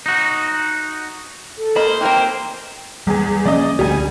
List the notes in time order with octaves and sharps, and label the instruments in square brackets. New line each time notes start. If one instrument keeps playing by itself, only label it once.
[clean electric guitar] D#4 F#4
[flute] A4
[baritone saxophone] A#3 [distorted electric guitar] C5 [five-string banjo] D#5 B5
[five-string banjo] E3 C4 A#4 [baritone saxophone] A#3 [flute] G5
[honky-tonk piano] E2 G#4 [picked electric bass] G3
[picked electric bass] F3 A#3 C#4 [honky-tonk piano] D5 D#5
[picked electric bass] D2 [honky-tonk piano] G3 G#5